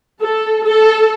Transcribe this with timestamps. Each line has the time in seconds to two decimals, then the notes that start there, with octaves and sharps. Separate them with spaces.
0.21 A4
0.64 A4